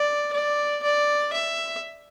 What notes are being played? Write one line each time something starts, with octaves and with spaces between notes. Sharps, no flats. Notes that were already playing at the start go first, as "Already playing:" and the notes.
Already playing: D5
D5
D5
E5